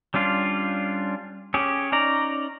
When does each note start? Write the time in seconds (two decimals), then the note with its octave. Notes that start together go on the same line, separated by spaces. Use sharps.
0.14 G3 C#4 D4 F4
1.54 C#4 G4 G#4
1.92 C#4 D#4 D5 A#5